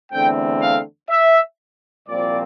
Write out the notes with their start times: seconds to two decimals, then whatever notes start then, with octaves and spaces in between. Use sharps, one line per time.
0.12 E2 D3 A3 C4 G5
0.62 F5
1.09 E5
2.08 C2 A#2 F3 C4 D5